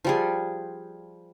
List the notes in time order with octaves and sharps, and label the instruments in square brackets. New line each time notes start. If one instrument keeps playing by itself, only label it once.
[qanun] F3 G3 G#4